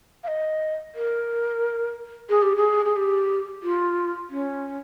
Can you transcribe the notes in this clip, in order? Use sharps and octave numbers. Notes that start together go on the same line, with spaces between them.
F5
D#5
A#4
G#4
G4
G#4
G#4
G4
F4
C#4